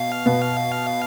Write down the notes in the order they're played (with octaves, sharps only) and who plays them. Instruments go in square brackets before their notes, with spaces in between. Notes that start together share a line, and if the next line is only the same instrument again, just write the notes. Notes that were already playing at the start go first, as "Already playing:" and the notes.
Already playing: [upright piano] B2 [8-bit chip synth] F5
[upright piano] B2 B3